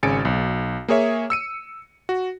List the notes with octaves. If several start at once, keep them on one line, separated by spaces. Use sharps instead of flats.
G#1 C#3 G#5 A6 C#7 D7
B1
A#3 G#4 C#5 E5
E6 C#7 D#7
F#4